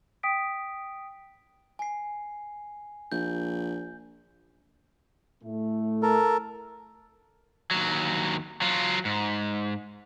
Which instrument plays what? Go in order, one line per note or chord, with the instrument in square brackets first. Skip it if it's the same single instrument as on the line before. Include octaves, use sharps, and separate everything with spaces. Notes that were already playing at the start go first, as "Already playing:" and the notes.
[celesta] G5 D#6 B6 D7
[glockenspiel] G#5 C7
[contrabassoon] A#1 [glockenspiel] G6
[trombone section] A2 A3
[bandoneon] A4 A#4
[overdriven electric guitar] D#2 F#3
F#3 F4
G#2